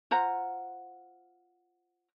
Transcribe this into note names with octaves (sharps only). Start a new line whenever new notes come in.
F4 C5 F#5 A#5